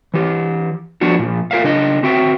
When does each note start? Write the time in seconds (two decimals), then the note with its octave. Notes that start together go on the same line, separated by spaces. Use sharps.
0.14 E3 G4
1.01 F3 B3 D4 F#4
1.19 A#2 F3
1.51 F4 A#4 E5 F5
1.64 C#3 D4 D#5
2.03 C4 F#4 E5 G5